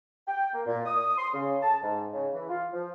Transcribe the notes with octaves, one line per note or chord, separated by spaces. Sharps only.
G5
A#3
A#2
D#6
C6
C#3
A5
G#2
C#3
E3
F4
F3